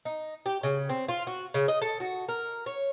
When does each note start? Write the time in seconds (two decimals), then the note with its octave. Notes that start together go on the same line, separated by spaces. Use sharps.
0.05 D#4
0.46 G4
0.63 C#3
0.89 C4
1.09 F4
1.27 F#4
1.54 C#3
1.68 D#5
1.82 A4
2.00 F#4
2.28 A#4
2.66 C#5